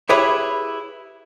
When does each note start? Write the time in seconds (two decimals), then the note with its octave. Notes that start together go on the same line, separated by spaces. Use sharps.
0.09 E4 G4 G#4 B4 C#5 E5